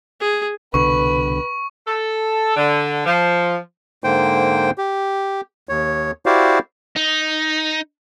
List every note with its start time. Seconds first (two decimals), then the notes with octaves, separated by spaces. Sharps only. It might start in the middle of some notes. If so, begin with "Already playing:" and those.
0.21 G#4
0.74 C2 B2 D3 B4 C#6
1.87 A4
2.56 D3
3.05 F3
4.04 G#2 D3 A#3 C5 G5
4.78 G4
5.69 D#2 C#5
6.26 E4 F#4 G4 C5 D5 F5
6.96 D#4